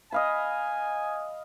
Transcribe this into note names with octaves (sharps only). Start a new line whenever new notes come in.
D#5 F5 G#5 B5